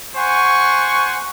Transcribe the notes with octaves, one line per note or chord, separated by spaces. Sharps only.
C5 F#5 G#5 C#6